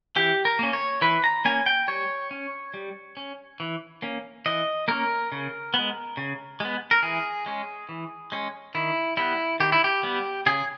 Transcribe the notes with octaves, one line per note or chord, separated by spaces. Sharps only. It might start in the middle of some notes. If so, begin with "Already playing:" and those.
E3 G4
A#4
A#3 C#4
C#5
E3 B4
A#5
A#3 C#4 G#5
G5
G3 C#5
C#4
G3
C#4
E3
A#3 C#4
E3 D#5
A#3 C#4 A#4
C#3
G#3 B3
C#3
G#3 B3
A#4
E3 G#4
G#3 C#4
E3
G#3 C#4
D#3 E4
G3 B3 E4
D#3 G4
E4
G4
G3 B3
C#3 G#4